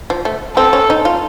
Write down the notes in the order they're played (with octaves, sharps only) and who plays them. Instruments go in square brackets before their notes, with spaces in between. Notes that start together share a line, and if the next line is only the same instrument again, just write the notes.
[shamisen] F3
A3
[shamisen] C4 [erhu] A4
[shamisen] C#4
D#4
F4